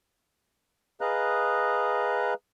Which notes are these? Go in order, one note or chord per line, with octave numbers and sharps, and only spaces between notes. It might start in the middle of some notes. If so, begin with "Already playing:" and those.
G#4 B4 D#5 F5 A#5 F#6